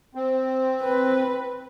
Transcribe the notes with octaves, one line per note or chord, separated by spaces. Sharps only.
C4
B4